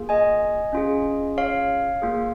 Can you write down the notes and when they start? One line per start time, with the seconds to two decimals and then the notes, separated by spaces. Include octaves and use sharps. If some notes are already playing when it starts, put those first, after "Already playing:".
Already playing: A#3 F4 G#4
0.09 D#5 G#5
0.73 C#4 F4 G#4
1.38 C#5 F5
2.02 A#3 F4 G#4